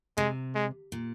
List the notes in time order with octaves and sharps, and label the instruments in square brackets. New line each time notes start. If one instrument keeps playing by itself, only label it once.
[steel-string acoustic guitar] C3 [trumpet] G#3
[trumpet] G#3
[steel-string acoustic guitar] A#2